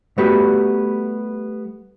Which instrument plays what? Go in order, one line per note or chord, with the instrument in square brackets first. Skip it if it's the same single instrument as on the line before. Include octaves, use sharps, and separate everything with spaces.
[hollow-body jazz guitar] G3 A3 B3 F#4 G4 B4